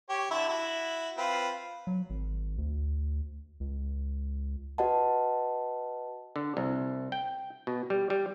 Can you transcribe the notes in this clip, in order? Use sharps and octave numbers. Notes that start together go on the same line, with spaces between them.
G4 C#5
D3 E4 E5
E4 F#4
C4 F4 B4
F#3
G#1
D2
C#2
F#4 B4 D#5 F#5 A5
D3
C2
G5
B2
G3
G3